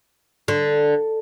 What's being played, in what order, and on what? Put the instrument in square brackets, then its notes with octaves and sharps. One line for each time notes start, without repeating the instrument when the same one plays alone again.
[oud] D3